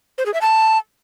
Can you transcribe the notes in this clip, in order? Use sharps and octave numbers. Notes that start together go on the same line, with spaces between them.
C5
G#4
E5
A5